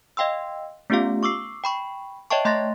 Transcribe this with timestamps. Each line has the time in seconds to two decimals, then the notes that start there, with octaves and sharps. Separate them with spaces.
0.17 D#5 F5 G5 C6 E6
0.90 A3 B3 C#4 F4 G4 F5
1.23 C#6 D6 E6 C7
1.64 G5 B5 C#6
2.30 C#5 D#5 E5 G5 A5 C#6
2.45 A3 D#5 C6 F#6 A6 A#6